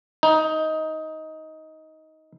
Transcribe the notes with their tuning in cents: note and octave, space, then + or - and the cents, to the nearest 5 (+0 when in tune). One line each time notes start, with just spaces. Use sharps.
D#4 +15